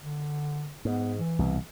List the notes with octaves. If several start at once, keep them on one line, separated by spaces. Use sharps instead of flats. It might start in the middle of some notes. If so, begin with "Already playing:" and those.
D3
G#2 B3
E3
C2 B2